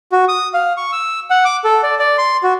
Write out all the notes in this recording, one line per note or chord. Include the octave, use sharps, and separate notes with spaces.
F#4
D#6
F5
C#6
E6
F#5
D6
A4
D5
D5
C6
F#4